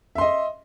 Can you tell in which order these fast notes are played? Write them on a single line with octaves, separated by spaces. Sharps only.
E5 C6 D#5